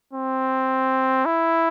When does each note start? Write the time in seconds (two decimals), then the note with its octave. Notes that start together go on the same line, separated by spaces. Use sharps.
0.14 C4
1.26 E4